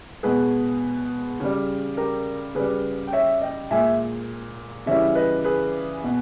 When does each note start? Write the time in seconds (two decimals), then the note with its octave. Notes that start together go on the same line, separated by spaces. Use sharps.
0.23 B2 G#3 G#4 B4
1.40 C#3 G3
1.97 G4 A#4
2.55 C#3 G3 G#4 B4
3.07 G5
3.13 C#5 E5
3.42 D#5 G5
3.71 A#2 G#3 E5 G#5
4.86 C#3 E3 G3 C#5 E5
5.15 B4 D#5
5.44 G#4 B4
6.03 B2